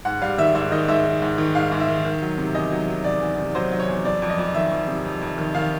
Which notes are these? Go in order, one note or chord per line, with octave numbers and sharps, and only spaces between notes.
G#2 F#5
G3 F5
D#3 E5
G#2 E5
D#3 D#5
G#2 E5
D#3
G#2
D#3
G#2 F5
G#2
E5
D#3
D#3
F#3
C3
E2 D#5
F#3
F#3
F#3 D5
E2
C3
F#3 C5
F#3
C#5
E2
F2 D5
F2
D#5
F2
D#3 E5
F2
C3
F2
F2
D#3
D#3 F5